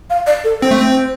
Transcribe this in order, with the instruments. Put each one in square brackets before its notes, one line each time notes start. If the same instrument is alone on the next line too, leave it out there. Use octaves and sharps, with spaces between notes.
[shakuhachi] F5
D5
A4
[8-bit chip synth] C4 [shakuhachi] C5
[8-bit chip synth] A3
C4